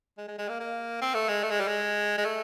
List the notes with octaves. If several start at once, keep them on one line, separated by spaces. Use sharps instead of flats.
G#3
G#3
G#3
A#3
A#3
C4
A3
G#3
A3
G#3
G3
G#3
G#3
A3